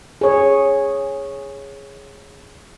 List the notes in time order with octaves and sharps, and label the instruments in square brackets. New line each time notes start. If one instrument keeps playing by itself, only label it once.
[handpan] G#4 C#5